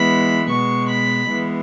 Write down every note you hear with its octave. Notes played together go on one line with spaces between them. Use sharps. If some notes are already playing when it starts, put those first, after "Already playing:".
Already playing: E3 G#3 B3 B5
B2 G#3 B3 C#6
B5
E3 G#3 B3